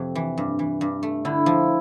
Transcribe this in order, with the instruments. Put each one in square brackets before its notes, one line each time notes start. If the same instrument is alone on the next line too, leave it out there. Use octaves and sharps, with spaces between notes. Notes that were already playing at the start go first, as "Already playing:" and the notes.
Already playing: [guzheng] F2 C3
E3
G2
E3
G2
A3
[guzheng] D3 [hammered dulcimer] E4
[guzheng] F3